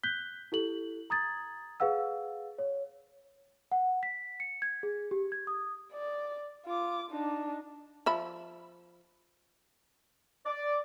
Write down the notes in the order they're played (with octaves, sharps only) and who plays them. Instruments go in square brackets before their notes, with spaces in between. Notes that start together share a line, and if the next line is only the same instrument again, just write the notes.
[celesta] F#6 G6 B6 G7
E4 G4 A4 F#7
A#5 D#6 G#6 A6
G#4 B4 F5 F#5 E6
C#5
F#5
B6
C#7
G#6
G#4
G4
G#6
D#6
[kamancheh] D5
F4 D6
D4 D#4
[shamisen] F3 E5 B5
[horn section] D5